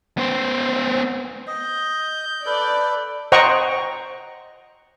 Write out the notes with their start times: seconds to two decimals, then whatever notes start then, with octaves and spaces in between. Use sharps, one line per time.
0.18 B3 C5
1.47 D#5 G6
2.46 A4 B4 D5
3.32 C5 D#5 F#5 G5 A#5 C#6